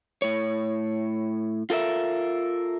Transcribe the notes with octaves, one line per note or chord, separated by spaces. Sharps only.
A2 C#5
F4 A4 A#4 E5